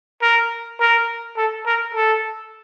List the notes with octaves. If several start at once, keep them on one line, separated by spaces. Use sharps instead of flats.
A#4
A#4
A4
A#4
A4